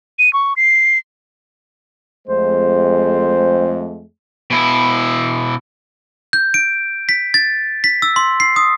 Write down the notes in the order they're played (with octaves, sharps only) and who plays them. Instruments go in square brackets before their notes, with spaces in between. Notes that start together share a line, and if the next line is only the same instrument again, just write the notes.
[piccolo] D#7
C#6
C7
[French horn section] F2 G#3 A3 [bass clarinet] C5
[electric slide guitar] B2 E4
[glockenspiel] G6
D7
B6
A6
B6
E6
C6
C7
D#6